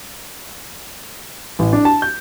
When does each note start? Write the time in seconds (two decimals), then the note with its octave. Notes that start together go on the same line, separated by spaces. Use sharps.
1.59 A1
1.73 D4
1.85 A5
2.02 G6